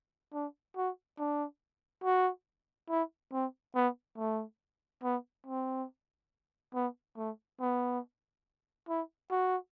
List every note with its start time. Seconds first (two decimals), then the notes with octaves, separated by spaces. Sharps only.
0.34 D4
0.77 F#4
1.19 D4
2.04 F#4
2.90 E4
3.33 C4
3.75 B3
4.18 A3
5.03 B3
5.47 C4
6.74 B3
7.17 A3
7.60 B3
8.89 E4
9.31 F#4